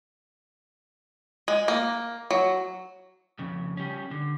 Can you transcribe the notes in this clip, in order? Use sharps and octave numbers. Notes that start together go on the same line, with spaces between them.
G#3
A#3
F#3
F2 C#3
G3 C#4
D3